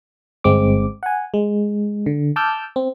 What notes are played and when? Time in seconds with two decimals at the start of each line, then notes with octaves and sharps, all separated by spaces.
0.44 G1 G#3 C4 D6
1.03 F#5 G#5
1.34 G#3
2.06 D3
2.36 A5 D6 E6 F6 G6
2.76 C4